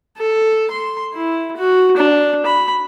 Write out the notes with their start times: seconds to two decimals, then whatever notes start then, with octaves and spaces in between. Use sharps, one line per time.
0.18 A4
0.71 C6
1.14 E4
1.57 F#4
1.97 D4
2.46 B5